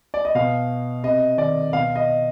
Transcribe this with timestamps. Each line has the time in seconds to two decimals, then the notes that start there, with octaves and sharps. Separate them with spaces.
0.14 D5
0.25 D#5
0.35 B2 F5
1.03 C3 D#5
1.37 D#3 D5
1.73 B2 F5
1.96 D#5